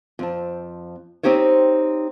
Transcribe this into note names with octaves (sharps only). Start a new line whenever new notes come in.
F2 C4 A5
C4 D#4 G4 C5 C#5